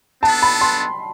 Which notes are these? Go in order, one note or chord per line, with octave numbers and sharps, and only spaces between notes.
B3 D4 A4 A5
B5
C6